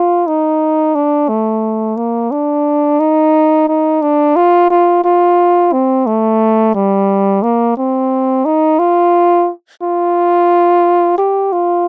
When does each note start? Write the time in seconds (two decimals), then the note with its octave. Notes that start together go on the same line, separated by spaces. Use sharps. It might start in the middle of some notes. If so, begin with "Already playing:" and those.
Already playing: F4
0.27 D#4
0.95 D4
1.29 A3
1.97 A#3
2.31 D4
3.00 D#4
3.68 D#4
4.02 D4
4.36 F4
4.71 F4
5.04 F4
5.73 C4
6.06 A3
6.75 G3
7.43 A#3
7.77 C4
8.45 D#4
8.79 F4
9.82 F4
11.18 G4
11.52 F4